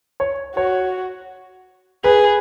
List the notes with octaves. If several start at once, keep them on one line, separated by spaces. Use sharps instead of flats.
C#5
F#4 C#5
G#4 B4